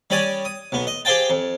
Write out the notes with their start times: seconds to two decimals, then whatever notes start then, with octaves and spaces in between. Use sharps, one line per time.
0.10 G3 C#4 D5 G#5 D#6
0.45 D#6
0.72 B1 B3
0.87 D#5
1.05 G4 G#4 C5 F5 G5 A5
1.30 F2